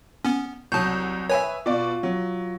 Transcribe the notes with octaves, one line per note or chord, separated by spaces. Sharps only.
B3 C#4
C2 F#3 A5 C#6 D#6 G6
B4 C#5 E5 G#5
B2 F4 D5 F5 C#6
F#3